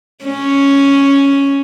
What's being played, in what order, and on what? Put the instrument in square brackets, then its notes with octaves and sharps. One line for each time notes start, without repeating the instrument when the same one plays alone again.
[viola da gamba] C#4